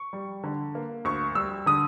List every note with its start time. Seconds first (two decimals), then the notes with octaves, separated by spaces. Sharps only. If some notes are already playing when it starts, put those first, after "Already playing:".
Already playing: C#6
0.13 G3
0.43 D3
0.75 A#3
1.05 D2 C#6
1.35 G3 E6
1.66 D3 D#6